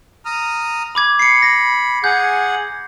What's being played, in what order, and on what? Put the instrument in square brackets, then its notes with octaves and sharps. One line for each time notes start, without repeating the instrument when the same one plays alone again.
[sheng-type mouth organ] A#5 D#6 F6
[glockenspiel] B5 D6 G#6
[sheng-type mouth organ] B5 [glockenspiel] C7 C#7
[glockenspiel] A#6
[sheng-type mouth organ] G#4 F#5 [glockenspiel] G6